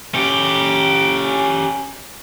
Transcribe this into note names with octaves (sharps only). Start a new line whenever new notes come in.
C#4 G4